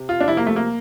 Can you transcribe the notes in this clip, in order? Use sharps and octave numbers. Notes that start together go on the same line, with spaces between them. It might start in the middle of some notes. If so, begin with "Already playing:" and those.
Already playing: C3
F4
D4
C3 F3 E4
A#3
A3
A#3